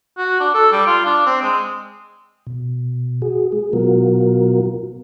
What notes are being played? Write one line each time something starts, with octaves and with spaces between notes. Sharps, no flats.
F#4
D4
A4
G3
F4
D4
C4
G#3
B2
F#4 G#4
G#3 G#4
B2 F#3 B3 F4 F#4 A#4